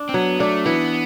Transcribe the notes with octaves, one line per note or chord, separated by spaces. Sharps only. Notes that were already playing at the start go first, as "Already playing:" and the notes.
Already playing: D4
C4
F#3 B3
A3 D4
E3 B3